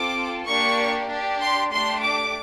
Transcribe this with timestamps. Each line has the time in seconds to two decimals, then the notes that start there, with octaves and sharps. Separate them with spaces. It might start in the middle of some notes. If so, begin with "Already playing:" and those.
Already playing: C4 F4 A4 D6
0.47 A#3 D4 G4 C#6
1.09 D4
1.14 G4
1.41 C6
1.71 A3 D4 G4 C6
2.02 D6